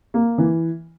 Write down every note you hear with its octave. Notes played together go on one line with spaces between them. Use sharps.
A#3
E3